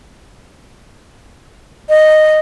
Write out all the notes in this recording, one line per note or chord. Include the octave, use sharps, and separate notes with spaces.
D#5